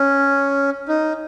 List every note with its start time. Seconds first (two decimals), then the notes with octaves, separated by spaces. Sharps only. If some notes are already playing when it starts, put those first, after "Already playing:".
Already playing: C#4
0.88 D#4